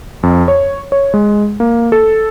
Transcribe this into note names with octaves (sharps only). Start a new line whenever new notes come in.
F2
C#5
C#5
G#3
A#3
A4